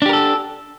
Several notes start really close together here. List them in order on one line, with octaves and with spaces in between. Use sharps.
D4 G4 A#4 A4